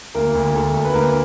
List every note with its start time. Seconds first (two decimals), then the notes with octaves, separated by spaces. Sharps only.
0.15 D2 A#3 A#4
0.35 D2
0.54 D2 A4
0.74 D2
0.85 B4
0.93 D2 A#3 A#4